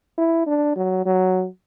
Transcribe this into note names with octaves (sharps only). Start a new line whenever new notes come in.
E4
D4
F#3
F#3